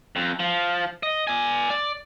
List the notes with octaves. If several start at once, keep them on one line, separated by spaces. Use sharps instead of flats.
F2
F3
D#5
D5 G#5
D5